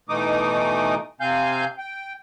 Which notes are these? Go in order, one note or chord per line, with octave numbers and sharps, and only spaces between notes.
B2 E3 A3 D#4 D6 D#6
C3 C4 F5 G#5 G6
G5